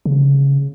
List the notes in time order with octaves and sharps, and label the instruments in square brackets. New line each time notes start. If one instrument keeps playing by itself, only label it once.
[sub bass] C#3